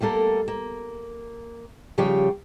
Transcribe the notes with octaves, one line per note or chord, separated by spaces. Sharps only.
G3 A3 A#3 A4 A#4
A#3
C#3 F3 G3 G4 C#5 G5